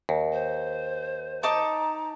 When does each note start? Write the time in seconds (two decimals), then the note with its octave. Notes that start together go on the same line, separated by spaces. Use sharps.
0.09 D#2
0.32 C5
1.43 D#4 A5 A#5 D6